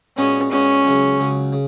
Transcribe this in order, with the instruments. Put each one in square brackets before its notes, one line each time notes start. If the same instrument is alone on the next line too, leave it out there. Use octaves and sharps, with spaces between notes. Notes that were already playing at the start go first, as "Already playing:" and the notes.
[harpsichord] A#2 G#3 B3 F#4 [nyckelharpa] C#4
[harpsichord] A#2 G#3 B3 F#4 [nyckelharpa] C#4
[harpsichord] C#2 C#3 F#3
C#2 C#3 F#3
C#3